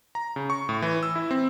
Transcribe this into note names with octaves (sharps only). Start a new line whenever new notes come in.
A#5
C#3
C#6
A2
E3
E6
E4
C4